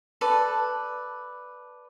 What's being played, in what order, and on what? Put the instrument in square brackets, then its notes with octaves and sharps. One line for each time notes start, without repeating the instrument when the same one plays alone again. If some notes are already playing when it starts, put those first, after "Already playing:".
[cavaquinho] A4 B4 D5